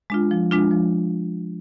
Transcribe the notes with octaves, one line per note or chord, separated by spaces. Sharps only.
G#3 D4 F4
F3
G#3 D4 F4
F3